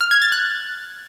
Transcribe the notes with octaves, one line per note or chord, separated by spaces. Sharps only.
F6
G#6
A6
F#6